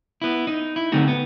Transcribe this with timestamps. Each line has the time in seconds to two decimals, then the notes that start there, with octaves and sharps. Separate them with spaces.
0.22 B3 E4
0.47 D#4
0.76 E4
0.92 D3 A3 C4 D#4 F#4
1.08 B3